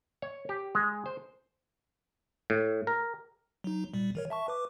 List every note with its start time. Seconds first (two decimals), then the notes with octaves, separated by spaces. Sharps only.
0.22 C#5
0.49 G4
0.75 G#3
1.06 C5
2.50 A2
2.87 A#4
3.64 F#3 D#4
3.94 A#2 G3
4.15 E3 A#4 C#5
4.30 E5 A5 C#6
4.48 B4 D6